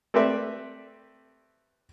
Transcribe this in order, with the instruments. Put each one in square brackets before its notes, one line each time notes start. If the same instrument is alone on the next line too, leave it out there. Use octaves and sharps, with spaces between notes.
[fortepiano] A3 C4 G4 B4 D5 E5